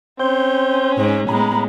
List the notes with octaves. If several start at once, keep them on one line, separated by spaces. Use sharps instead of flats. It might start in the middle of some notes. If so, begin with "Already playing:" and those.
C4 C#4 C6 G6
G#2
A2 G#3 B3 A#5 B5